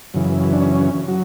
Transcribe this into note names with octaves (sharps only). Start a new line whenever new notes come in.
F#2 C#3 E3
D4
C#4
F#3